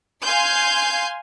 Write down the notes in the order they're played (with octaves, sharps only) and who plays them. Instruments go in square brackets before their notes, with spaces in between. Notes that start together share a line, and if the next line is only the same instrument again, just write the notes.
[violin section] F5 G#5 C6 G6 C7